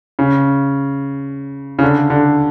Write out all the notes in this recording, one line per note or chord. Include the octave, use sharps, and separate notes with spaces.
C#3
C#3
D3
D3